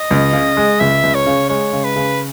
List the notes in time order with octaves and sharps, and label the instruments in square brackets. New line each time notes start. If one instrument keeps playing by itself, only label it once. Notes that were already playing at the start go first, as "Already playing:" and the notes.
Already playing: [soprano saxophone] D#5
[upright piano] C#2
C#3
G#3
[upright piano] C#2 [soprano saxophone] E5
[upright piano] C#2
[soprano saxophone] C#5
[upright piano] C#3
[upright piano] G#3 [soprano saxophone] C#5
[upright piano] C#3
[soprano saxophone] B4
[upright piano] C#3